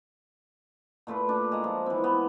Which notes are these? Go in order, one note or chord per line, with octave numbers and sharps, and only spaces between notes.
A#2 A3 F4 B4
D4
G#3 F4 A#5
F3
E3 C4
B3